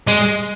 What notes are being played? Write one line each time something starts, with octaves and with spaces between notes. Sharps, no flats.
G#3